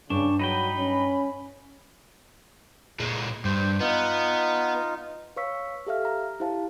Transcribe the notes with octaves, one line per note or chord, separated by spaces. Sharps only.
G2 C#3 D4 C#6
F#3 D#4 B4 G5 B5
C#4
A#2 G#3
G2 C5
B3 D#4 F4
B4 C#5 F5 C#6 E6 B6
G4 A4 E5 F5 F6
A#5
E4 G4 C5 F5 A5